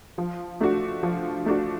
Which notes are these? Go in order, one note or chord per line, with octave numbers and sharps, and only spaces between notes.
F3
A3 D4 F#4
F3
A3 D4 F#4